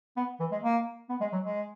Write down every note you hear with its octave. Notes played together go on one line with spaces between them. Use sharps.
B3
E3
G#3
A#3
B3
G#3
F#3
G#3